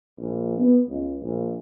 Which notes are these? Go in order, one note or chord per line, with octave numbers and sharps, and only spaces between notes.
A#1
B3
C#2
A#1